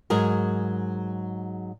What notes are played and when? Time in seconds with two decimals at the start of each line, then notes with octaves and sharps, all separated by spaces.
0.10 G#2 F#3 G#4 A#4